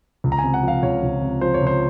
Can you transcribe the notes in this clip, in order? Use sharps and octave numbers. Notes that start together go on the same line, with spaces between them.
C#2
A#5
G#5
C3
F#5
F3 F5
C#2 C#5
C#2
C3
F3 C5
C#5
C#2
C5